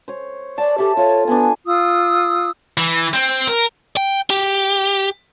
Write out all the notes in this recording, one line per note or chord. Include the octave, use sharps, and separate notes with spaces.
C5 C#5
D5 A5
G4 A4 E5
F4 C#5
B3 D4 G#5
F4 D#6 E6
E3
C4
A#4
G5
G4